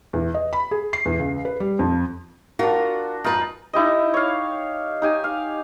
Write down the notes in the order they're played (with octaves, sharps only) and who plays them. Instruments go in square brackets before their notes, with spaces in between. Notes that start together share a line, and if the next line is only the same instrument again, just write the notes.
[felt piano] E2
D#5
B5
G#4
C7
E2
C#2
B4
G3
F2
[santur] D4 F#4 [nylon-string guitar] F4 A#4
[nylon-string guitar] F#2 B4 [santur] D#4 F4
[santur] D#4 E4 G4 D#5
C#5 F5
D#4 G4 G#5
F5